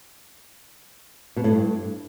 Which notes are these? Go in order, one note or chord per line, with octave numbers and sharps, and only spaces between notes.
B2
A2
G2